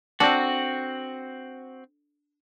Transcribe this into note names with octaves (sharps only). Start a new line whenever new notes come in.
C4 D4 F#4 A4